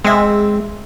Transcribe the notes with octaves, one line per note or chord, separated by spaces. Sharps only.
G#3 C4 E5